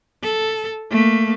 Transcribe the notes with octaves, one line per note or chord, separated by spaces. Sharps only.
A4
A3 A#3